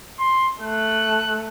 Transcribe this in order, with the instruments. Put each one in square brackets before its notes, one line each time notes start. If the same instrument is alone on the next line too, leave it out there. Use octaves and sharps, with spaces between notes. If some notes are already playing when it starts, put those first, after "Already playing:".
[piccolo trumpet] C6
[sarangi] A3 [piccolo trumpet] F#6